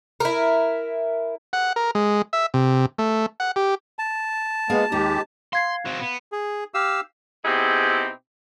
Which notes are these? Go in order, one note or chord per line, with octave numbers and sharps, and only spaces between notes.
E4 A#4
F#5
A#4
G#3
E5
C3
A3
F#5
G4
A5
G#3 A#3 B3 G#4 F5
D#2 G#3 D#4 G4 A#5
F5 C6 G#6 C7
C4 F#4
B3
G#4
G4 F5 E6
B2 C4 D#4 E4 G4 G#4